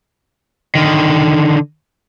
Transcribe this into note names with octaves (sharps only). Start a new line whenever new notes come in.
D3 D#3